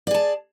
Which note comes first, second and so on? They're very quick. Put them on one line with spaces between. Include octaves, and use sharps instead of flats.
D5 G#4 A5